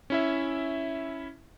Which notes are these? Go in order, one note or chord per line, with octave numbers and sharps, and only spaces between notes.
C#4 E4 E5